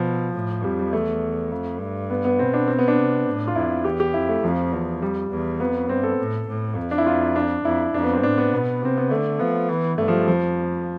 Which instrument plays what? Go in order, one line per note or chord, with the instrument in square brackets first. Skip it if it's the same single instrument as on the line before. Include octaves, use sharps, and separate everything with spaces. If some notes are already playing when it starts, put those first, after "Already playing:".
Already playing: [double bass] B2 [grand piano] F3
[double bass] A2
[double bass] F2 [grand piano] G3
[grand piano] G3
[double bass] E2 [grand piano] A3
[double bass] F2
G2
[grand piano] B3
B3
[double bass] B2 [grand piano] C4
[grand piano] D4
C4
B3
D4
[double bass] C3
A2
[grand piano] F4
[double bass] F2 [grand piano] E4
[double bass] E2 [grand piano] G4
[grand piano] G4
[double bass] F2 [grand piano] E4
[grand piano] A3
[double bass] F2 [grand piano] F3
[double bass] E2
[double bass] F2 [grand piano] G3
[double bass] E2
[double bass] F2 [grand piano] B3
[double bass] G2 [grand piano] C4
[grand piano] A4
[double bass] A2
A2
F2
[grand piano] D4
E4
F4
D4
[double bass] F2 [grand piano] E4
[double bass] F2 [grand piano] D4
[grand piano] B3
C4
[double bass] A2 [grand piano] D4
[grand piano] B3
[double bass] B2
[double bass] C3 [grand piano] C4
[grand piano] B3
[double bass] D3 [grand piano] A3
[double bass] F3 [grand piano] B3
[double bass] E3
[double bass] G2 [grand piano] A3
[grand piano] F3
G3
[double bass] F2 [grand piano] F3